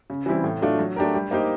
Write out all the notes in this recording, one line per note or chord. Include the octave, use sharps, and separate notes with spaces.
C#3
E3 G3 C4 E4
A2
F#3 A3 D4 F4
F#3
A3 D4 G4 A#4
G3
A#3 D#4 G4 C5